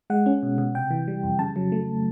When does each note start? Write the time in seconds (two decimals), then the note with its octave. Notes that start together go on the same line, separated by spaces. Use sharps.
0.10 G#3 F#5
0.26 C#4
0.43 B2
0.58 B2
0.75 C3 G5
0.91 E3
1.08 G3
1.23 F2
1.39 C#3 A5
1.56 F#3
1.72 A3